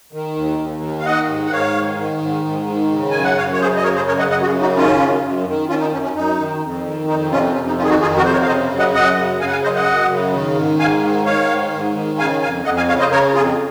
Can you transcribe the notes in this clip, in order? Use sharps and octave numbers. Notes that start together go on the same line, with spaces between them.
D#3
D#2
D#2
D#3
F5
D#3 D#5 F#5
G#2
F#5
G#2 C#5 F5
D#3
D#3
G#2
G#2
D#3
C#3
F#2 G#5
F#5
F#2 C#5 F5
C#5
C#3 G#4 C5
D#5
C#3 A#4 C#5
G#4 C5
F#2 A#4 C#5
D#5 F#5
F#2 D#5 F#5
F#4
F4 G#4
C#3
D#4 F#4
D#3 C#4 F4
F#2
F#2
D#3
D#3 C#4 F4
D#4
F#2 C#4
C#4
F#2 D#4
D#3
F2
D#3
F2 D#4
C3 C#4 F4
F2 C#4
D#4
D#3 C#4 F4
G#4
D#4 F#4
F2 F4 G#4
F#4 A#4
C3 C5
A#4 C#5
F5
C#3 C5 D#5
F#2
D#5 F#5
F#2 D#5 F#5
C#3
C#3 F5 G#5
F#5
F5 G#5
F#2 C5 D#5
D#5 F#5
F#2
C#3
D#3
G#2
G#2 F5 G#5
D#3
D#3 C#5 F5
G#2
G#2
D#3
C#3 F5 G#5
F2 F5 G#5
F2 D#5 F#5
F5 G#5
C#3 C#5 F5
C5 D#5
C#3 A#4 C#5
F2 F4 G#4